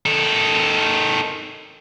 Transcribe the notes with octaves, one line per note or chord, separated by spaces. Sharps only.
D#3 A4